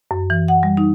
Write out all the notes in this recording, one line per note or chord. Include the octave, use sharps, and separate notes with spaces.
F#2
E3
F#5
G3
D#4